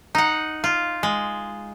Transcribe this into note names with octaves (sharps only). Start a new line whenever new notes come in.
D#4 F#5
F4
G#3